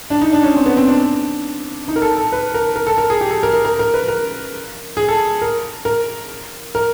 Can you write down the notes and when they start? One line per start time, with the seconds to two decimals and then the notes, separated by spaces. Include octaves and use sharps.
0.10 D4
0.21 D#4
0.32 D4
0.43 C#4
0.55 C4
0.66 B3
0.77 C4
0.88 D4
1.88 D#4
1.96 A#4
2.02 A4
2.17 A4
2.33 B4
2.54 A#4
2.76 A#4
2.87 A4
2.98 A#4
3.10 G#4
3.21 G4
3.31 A4
3.43 A#4
3.53 A#4
3.65 A#4
3.79 A#4
3.94 B4
4.08 A#4
4.97 G#4
5.09 A4
5.42 A#4
5.85 A#4
6.75 A#4